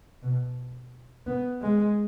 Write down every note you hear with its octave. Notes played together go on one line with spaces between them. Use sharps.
B2
B3
G#3